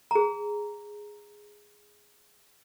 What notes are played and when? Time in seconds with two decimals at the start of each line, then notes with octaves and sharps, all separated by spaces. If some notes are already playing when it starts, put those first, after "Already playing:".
0.11 G#4 A#5